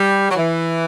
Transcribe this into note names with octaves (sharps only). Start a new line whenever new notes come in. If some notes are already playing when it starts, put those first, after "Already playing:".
Already playing: G3
F#3
E3